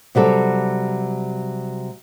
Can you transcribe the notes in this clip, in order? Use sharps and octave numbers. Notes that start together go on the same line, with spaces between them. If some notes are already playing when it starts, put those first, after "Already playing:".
C3 F#3 G3 A4